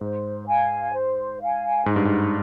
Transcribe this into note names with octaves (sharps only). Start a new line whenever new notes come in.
G#2 C5
F5 G#5
C5
F5 G#5
G#2 D#4
G2
G#2